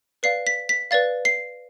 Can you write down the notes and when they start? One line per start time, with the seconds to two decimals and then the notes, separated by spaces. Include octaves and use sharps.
0.23 B4 D5 F5 C7
0.47 B6
0.69 B6
0.91 B4 D5 F5 A6
1.25 C7